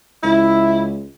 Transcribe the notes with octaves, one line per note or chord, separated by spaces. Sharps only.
C#2 E4